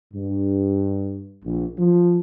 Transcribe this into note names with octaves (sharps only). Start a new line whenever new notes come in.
G2
A#1
F3